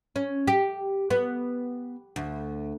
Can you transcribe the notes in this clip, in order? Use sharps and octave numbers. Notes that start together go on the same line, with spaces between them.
C#4
G4
B3
D2